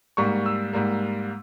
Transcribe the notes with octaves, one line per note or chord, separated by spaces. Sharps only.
G#2 G3 A#3 C#6
E6
G#2 G3 A#3